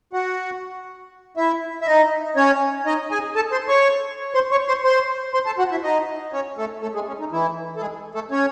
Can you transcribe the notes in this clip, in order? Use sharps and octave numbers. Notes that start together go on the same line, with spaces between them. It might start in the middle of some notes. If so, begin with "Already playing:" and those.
F#4 F#5
E4 E5
E5
D#4 D#5
C#4 C#5
D#4 D#5
G#4 G#5
A4 A5
C5 C6
C#5 C#6
C5 C6
C#5 C#6
C5 C6
C5 C6
C5 C6
A4 A5
F#4 F#5
E4 E5
D#4 D#5
C#4 C#5
A3 A4
A3 A4
G#3 G#4
C#4
D#4
E3 E4
A4
G#3 G#4
A3 A4
C#4 C#5